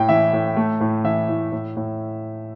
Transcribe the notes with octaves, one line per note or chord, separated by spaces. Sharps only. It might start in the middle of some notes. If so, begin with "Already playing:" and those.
Already playing: A2 A3 G5
E3 E5
A2
A3
A2
E3 E5
A2
A2
A2